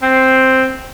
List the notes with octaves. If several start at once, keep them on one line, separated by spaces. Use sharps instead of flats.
C4